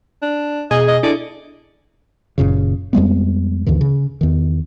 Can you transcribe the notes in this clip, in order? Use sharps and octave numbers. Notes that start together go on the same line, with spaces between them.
D4
B2 G#4 D#5
D#5
D4 E4 A4 D5
F#1 F#2 A#2 C#3
F2 G3 G#3 B3
D2 G2 D3 E3
C#3
E2 D#3